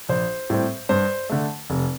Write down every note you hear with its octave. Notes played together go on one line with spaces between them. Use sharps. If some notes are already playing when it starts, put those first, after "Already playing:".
A#1 C5
A2 G3 C4
G2 C5
D3 A3
F1